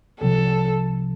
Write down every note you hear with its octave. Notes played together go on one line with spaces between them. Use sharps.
C2 C3 F3 A4